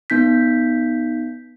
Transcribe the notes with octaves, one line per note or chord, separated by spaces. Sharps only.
B3 D#4 G6 B6